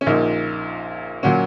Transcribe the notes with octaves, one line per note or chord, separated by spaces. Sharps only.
C#4
A#1 A#2 A#3 D#4
A#2 F#3 C#4 F#4